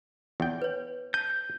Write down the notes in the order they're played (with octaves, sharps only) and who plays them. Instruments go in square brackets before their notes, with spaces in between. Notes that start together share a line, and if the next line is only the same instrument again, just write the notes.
[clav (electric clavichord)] E2 G5
[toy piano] B4 C#5
[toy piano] A5 [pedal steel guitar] G6